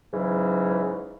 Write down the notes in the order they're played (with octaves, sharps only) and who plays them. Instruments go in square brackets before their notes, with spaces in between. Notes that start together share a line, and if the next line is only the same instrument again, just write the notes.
[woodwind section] G#2 C#3 E3 F#3